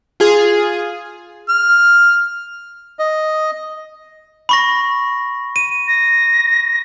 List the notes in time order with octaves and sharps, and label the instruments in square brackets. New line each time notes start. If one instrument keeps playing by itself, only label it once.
[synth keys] F4 G#4
[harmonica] F6
[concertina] D#5
[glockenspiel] B5 C#6 A#6
D#7
[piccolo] A#6